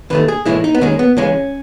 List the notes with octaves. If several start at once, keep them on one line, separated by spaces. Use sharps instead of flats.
D#2 D#3 A3 B4
G#4
A2 E3 G#3 E4
D#4
B3
D#2 D#3 G#3 C#4
B3
C#2 C#3 E3 G#3 C#4